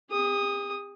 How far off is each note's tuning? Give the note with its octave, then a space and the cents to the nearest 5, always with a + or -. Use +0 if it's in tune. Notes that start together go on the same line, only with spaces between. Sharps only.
G4 +45 D#6 +0